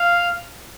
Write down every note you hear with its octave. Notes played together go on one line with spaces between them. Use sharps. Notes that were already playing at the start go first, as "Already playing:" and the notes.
Already playing: F5